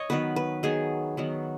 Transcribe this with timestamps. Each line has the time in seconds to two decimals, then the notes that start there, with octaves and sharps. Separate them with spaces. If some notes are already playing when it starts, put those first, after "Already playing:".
Already playing: C#5 D#5
0.10 D#3 F#3 B3 B4
0.36 B4
0.63 D#3 F#3 B3 G#4
1.17 D#3 F#3 B3